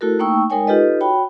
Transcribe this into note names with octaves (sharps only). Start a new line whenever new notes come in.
A3 E4 F#4 A4 A#4
A3 A#3 D#4 G5 C#6 E6
G#3 D#4 A#4 C#5 G5 G#5
D#4 F4 G4 A4 B4 D#5
F#4 C#5 G5 B5